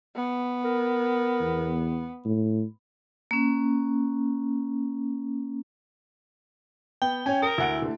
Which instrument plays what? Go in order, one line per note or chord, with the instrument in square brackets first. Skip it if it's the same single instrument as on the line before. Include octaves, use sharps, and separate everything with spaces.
[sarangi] B3
[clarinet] A#4
[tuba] E2
A2
[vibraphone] A#3 C#4
[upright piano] B3 [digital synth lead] G5
[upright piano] C#4 C#5 [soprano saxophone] G#5
[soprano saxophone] A#4 [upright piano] D#6
[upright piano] D2 F#5 D7 [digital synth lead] E4
[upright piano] D3 A3